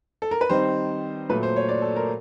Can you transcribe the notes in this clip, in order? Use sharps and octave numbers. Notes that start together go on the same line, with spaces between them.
A4
A#4
B4
D#3 G3 C4 D#4 C5
A#2 F#3 A3 B4
C5
C#5
D5
A4
A#4